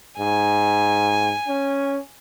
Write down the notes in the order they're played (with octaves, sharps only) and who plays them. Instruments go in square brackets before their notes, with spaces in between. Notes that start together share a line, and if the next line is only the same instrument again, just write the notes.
[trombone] G#2 [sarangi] G#5
[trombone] C#4